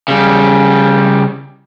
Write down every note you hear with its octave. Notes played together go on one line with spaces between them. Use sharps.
C#3 G3